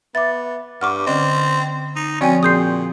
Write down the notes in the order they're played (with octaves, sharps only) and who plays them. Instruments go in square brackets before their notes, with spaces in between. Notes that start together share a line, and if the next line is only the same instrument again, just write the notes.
[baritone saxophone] B3 [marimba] E5 D6 [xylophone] A6
[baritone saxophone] G2 [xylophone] F#5 C#6 D6 [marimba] F6
[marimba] D3 C#4 D5 [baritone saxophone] C4 [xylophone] D#5
[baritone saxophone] D#4
[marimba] F3 C4 F#4 [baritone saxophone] C#4 [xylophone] D5 G5 G#5
[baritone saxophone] A#2 [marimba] G#4 C6 [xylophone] D#6 G6 C7